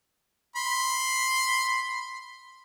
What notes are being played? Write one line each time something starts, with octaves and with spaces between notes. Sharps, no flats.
B5 C6